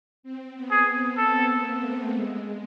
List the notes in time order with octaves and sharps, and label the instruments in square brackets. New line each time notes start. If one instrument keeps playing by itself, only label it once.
[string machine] C4
B3
[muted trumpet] G#4
[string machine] B3
[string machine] C4 [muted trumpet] A4
[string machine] A#3
A3
G#3